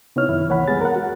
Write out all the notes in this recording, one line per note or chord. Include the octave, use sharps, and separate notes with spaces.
C3 B3 D#4 E4 C#5 F6
F#2 D#3 E4
C2 E3 A#3 C#5 F#5 B5
G3 G#3 B3 G#4 B5 A6
A#4 F#5
F#4